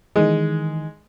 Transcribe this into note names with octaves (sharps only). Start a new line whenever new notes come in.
D#3 E3 G#3